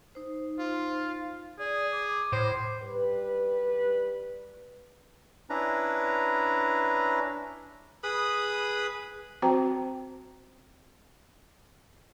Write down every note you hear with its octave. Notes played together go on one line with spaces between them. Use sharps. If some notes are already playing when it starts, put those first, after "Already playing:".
D#4 C5
F4
G#4 D5
D6
A2 C5
G3 B4
C#4 D4 E4 B4 A#5
G#4 B4 B5 D#6
C4 F#4 C5 G5 A#5